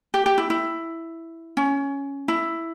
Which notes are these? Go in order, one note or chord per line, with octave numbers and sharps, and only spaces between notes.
G4
G4
E4
E4
C#4
E4